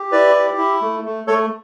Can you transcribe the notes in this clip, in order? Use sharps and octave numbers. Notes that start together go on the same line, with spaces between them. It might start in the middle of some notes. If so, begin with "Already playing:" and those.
Already playing: G4
E4 B4 D5
G4
E4
A3
A3
A3 A4 C#5